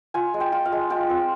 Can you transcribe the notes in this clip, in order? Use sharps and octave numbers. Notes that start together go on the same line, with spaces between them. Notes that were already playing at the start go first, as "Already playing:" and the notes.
F4 G#5
G#3
G5
F4
F5
G#3
F4 G5
C4